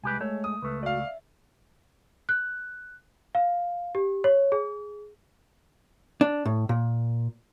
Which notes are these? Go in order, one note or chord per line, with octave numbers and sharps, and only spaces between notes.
C2 G#3 G4 B4 G#5
A3 C#5
D#6
C#2 A3 B4
F#4 D5 F5
E5
F#6
F5
G4
C#5
G#4
D4
A2
A#2